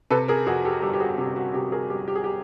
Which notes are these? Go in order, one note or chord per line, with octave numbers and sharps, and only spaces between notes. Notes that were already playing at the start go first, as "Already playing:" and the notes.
C3 A4 B4
G#4 A#4
F2 F#4 G#4
G4 A4
G1 G4 A4
G4
F#4 G#4
C3 G4
F#4
C3 G4
G#4 A#4
G1 G4
G4
G#4
G4